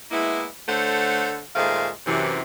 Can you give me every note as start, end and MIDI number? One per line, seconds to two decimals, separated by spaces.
0.11 0.46 56
0.11 0.46 58
0.11 0.46 59
0.11 0.46 64
0.69 1.38 50
0.69 1.38 57
0.69 1.38 69
0.69 1.38 72
0.69 1.38 73
0.69 1.38 78
1.56 1.89 46
1.56 1.89 51
1.56 1.89 56
1.56 1.89 57
1.56 1.89 72
1.56 1.89 77
2.07 2.41 42
2.07 2.41 48
2.07 2.41 52